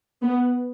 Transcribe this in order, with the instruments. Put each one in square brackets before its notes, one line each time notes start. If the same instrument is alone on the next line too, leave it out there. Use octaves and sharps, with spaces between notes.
[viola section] B3